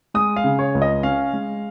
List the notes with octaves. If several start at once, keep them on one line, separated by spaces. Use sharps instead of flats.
G#3 D#6
F5
C#3
C#5
C#2
D#5
C#4 F5
G#3